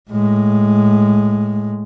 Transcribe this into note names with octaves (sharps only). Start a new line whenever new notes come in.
A2 G#3